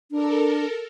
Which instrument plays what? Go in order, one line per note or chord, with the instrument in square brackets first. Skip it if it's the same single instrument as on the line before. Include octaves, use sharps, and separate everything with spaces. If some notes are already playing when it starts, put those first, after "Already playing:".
[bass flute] D4 [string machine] A4 A#4